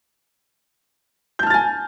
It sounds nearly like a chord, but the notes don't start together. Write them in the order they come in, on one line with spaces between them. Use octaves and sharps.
G6 A5 F6 A6 G#5